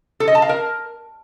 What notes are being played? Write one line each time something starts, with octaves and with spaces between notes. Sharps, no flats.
A4
D#5
A5
F5
A#4